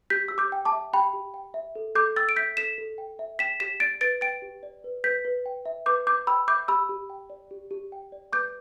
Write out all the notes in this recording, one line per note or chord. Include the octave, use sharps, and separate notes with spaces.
G4 G6 B6
G4 E6
D6 G6
G5
A5 D6
E5
G4 G5 B5
G4
G5
E5
A4
A4 D6 G6
G5 E6 A6
D7
E5 G6 B6
A4 B6 E7
A4
G5
E5
G5 B6 E7
G4 B6 E7
D5 A6 D7
B4 A6 D7
G5 A6 D7
G4
D5
B4
B4 G6 B6
B4
G5
E5
B4 D6 G6
B4 D6 G6
G5 B5 E6
E5 D6 G6
G4 B5 E6
G4
G5
D5
G4
G4
G5
D5
B4 D6 G6